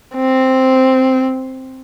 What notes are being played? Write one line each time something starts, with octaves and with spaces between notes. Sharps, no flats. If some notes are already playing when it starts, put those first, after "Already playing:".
C4